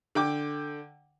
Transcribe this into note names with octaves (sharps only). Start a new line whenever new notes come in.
D3 G5 D6